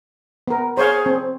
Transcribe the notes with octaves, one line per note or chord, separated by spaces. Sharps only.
B3 A#4
G#4 C5 C#5 F5
C4